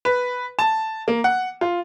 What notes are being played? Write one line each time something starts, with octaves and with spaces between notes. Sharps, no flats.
B4
A5
A#3
F#5
F4